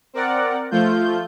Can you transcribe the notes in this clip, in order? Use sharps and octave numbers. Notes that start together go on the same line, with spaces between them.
C4 A#4 D5 F#5
F3 A3 F4 G6